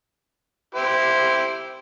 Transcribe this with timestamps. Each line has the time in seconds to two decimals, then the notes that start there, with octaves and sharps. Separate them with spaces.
0.75 E4 G4 C5